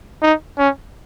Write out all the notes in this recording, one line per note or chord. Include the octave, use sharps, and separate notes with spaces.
D#4
C#4